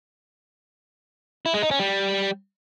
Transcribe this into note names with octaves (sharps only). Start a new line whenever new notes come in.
E4
G#3
D#4
C#4
G3